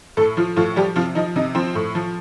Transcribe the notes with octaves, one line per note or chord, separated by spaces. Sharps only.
A2 A3 A4
F3 F4
A2 F3 F4
F3 G3 G4
C3 F3 F4
F3 D#4
C3 D#4
F3 C4 C5
A2
F3